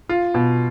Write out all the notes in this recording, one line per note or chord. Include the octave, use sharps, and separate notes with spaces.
F4
B2